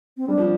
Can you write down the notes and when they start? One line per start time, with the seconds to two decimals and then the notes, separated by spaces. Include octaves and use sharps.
0.17 C4
0.28 G3 D4
0.38 F3